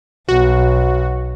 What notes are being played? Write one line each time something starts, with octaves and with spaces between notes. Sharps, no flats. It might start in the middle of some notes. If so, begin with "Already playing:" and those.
B1 F#4